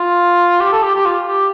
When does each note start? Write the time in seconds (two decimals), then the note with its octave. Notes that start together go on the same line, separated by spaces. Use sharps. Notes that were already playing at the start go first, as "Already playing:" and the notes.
Already playing: F4
0.60 G4
0.72 A4
0.83 G4
0.95 G4
1.05 F4
1.28 G4